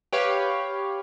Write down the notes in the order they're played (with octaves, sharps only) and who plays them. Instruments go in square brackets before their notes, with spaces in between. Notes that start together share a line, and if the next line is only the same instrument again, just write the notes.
[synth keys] G4 B4 C#5 F5 G5